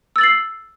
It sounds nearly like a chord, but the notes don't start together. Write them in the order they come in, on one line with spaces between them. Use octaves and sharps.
E6 A6 F#7 C7